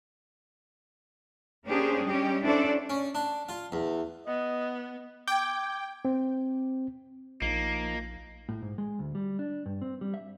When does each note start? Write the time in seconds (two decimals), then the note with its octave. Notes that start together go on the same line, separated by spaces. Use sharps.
1.66 A#3 C#4 D4 G4 G#4 C5
2.04 G3 C#4 G4 D#5
2.43 C#4 D4 E4 A4 C5 D5
2.90 C#4
3.15 D4
3.49 F4
3.72 E2
4.27 B3 D#5
5.28 G5 D6 G#6
6.05 C4
7.42 A#1 F3 A#3 D#4
8.49 A2
8.62 G#2
8.78 G#3
8.99 D2
9.15 G3
9.39 D4
9.66 G2
9.82 C4
10.01 G3
10.14 E5